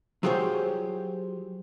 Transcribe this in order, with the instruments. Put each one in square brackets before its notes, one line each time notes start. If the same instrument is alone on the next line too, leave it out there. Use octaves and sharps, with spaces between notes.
[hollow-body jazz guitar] F#3 F4 G4 G#4 C5 C#5